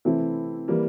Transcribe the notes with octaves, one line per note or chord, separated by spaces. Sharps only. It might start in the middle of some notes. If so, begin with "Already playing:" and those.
C3 E3 A3 C4 E4
E3 G3 A#3